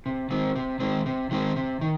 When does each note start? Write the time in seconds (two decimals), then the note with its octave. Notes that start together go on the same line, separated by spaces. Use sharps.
0.06 C3
0.30 D#3 G#3 C4
0.56 C3
0.80 D#3 G#3 C4
1.06 C3
1.31 D#3 G#3 C4
1.56 C3
1.81 D#3